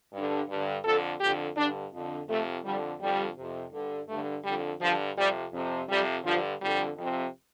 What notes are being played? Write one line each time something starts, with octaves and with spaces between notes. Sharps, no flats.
G2 D3
G2
D3
F2 D3 A4
F2 D3 G4
G2 D3 D4
F2 D3
F2 C3 A3
F2 D3 G3
F2 D3 G3
F2 C3
G2 D3
G2 D3 A3
F2 D3 G3
G2 D3 F3
F2 C3 G3
F2 C3
F2 C3 G3
G2 D3 F3
F2 D3 G3
F2 C3